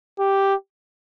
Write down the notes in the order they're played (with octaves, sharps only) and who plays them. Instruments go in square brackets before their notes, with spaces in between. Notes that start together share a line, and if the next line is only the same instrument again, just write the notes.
[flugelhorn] G4